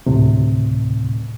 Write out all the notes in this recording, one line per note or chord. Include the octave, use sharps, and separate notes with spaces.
D2 A2 C3